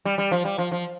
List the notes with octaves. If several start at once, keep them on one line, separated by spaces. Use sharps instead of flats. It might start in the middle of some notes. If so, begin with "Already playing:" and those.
G3
G3
F3
G3
F3
F3